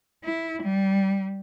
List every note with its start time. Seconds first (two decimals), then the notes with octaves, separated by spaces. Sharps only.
0.24 E4
0.62 G3